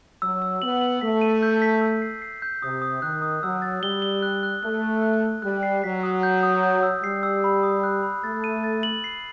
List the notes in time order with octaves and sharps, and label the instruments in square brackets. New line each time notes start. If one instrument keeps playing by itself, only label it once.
[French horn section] F#3 [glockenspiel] E6
[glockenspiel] E6
[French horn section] B3 [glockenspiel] F#7
[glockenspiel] F#7
[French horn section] A3 [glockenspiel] B6
[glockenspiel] D#7
G6
B6
E6
C7
C7
G6
[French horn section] C3 [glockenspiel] D#6
[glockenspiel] D#6
[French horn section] D#3 [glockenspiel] F#6
[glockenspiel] D#6
[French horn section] F#3 [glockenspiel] E6
[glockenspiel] A6
[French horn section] G3 [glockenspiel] G7
[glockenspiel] G7
F#6
F#6
[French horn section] A3 [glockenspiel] F#6
[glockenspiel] F#6
F#6
F#6
[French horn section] G3 [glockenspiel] F#6
[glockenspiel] C7
[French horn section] F#3 [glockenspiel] B6
[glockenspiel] D#6
G6
D#6
G6
E6
[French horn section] G3 [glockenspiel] C7
[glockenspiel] E6
B5
D#6
F#6
B5
[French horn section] A3 [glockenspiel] A6
[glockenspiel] D#7
A6
F#7
C7